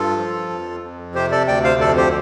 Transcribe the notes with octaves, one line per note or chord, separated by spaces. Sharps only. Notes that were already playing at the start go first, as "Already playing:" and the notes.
Already playing: G2 F4 A4
F3
F2
F2
C3 G4 C5
A4 D5
D2 D5 G5
C5 F5
F2 A4 D5
G4 C5